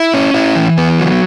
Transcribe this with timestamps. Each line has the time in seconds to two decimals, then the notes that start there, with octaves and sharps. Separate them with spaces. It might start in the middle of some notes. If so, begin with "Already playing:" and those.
Already playing: E4
0.14 C#4
0.34 E4
0.56 E3
0.78 B3
0.99 F#3